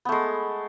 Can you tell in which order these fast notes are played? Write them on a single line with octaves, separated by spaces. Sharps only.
B3 A3 G#3